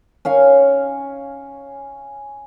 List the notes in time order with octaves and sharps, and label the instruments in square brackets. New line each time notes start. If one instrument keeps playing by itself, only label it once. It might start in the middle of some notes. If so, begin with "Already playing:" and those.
[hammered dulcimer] C#4 F5 G#5